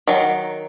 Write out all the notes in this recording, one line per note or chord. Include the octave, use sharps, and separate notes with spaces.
D#3 F#3